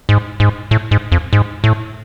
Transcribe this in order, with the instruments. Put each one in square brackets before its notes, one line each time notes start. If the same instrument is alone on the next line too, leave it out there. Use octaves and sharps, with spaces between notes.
[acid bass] G#2
G#2
A2
G#2
F2
G#2
A2